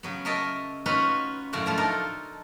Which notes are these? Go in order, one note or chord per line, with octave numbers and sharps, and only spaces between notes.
C#3 F#3 B3
A#4 C#5 D#5 E5 G5 A5
B3 C#4 D#4 F4 F#4 B4
F#2 A2 C#3 F#4
F3 A3 F4
D4 D#4 A4 A#4 A#5